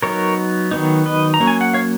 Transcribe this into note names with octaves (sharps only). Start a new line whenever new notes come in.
F#3 B3 D#4 A#4 C#5
D#3 F#3 B3 D#4
B4 D#5
A#5
F#3 A#3 C#4
G#5
F#5
C#5 F5